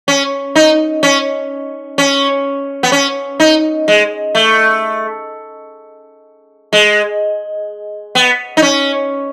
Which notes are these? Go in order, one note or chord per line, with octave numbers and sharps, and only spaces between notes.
C#4
D#4
C#4
C#4
B3
C#4
D#4
G#3
A3
G#3
B3
D#4
C#4